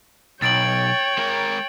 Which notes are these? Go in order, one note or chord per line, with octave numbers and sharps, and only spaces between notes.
B1 C#5 G5 A6 D7 F#7
G#3 A#4